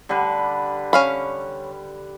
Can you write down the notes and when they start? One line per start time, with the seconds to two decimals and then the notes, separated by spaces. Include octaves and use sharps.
0.09 D3 G3 B4
0.93 C#4 F5 B5